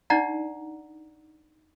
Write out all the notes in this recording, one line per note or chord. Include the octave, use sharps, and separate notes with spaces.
D4 D#4 D5 F#5 A#5